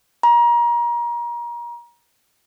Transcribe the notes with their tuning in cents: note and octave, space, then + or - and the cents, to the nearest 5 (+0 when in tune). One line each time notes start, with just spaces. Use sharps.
A#5 +30